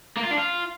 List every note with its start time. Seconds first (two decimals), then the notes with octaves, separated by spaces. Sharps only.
0.17 A#3
0.24 F4
0.31 D4
0.38 F4